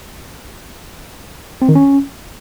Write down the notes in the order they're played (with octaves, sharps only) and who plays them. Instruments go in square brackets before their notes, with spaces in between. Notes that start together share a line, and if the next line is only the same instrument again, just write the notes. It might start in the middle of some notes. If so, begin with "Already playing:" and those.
[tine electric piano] C4
D#3
C#4